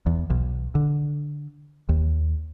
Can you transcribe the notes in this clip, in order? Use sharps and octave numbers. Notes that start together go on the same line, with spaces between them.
E2
B1
D3
D#2